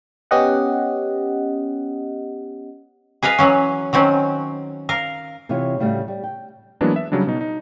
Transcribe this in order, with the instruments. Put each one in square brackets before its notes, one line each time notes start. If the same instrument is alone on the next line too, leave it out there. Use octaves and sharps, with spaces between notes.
[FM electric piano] B3 C#4 G4 D#5 F#5
[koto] G#4 B4 D#5 F5
E3 F#3 C#4
D#3 F#3 C4 C#4
A#4 F5
[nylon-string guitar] C3 E3 F4 C#5
A2 C#3 G3 A3 F#4
G3
G5
[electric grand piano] E3 F#3 G#3 A#3 B3 D4
E5
C#3 F#3 G3 D4
B2 D#4
D#4